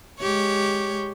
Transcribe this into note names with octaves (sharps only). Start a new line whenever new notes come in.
G#3 G4 C#5